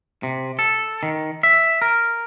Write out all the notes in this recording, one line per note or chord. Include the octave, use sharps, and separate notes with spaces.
C3
A4
D#3
E5
A#4